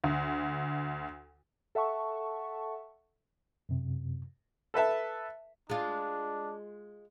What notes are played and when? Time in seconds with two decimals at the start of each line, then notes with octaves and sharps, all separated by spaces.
0.04 D2
1.75 A4 E5 F#5 A5 C#6
3.69 F#2 C3
4.74 A4 B4 E5 A5
5.70 G#3 D4 F4